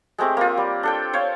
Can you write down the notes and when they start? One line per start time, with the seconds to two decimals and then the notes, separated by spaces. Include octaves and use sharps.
0.18 G#3 A3 C4 G4
0.37 A#3 F4
0.57 G3
0.83 D4 A4 G5
1.13 C5 C#5 F5